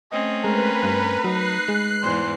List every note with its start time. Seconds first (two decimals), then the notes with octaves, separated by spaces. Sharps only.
0.12 A3 C4 C#4 D#5
0.44 G#3 A#4 B4
0.83 G2
1.24 F#3 D#4 F#6 C7
1.68 G#3
2.02 E2 G#2 C5